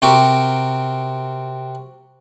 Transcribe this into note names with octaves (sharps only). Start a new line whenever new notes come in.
C3 C4 F#4 G4 A#4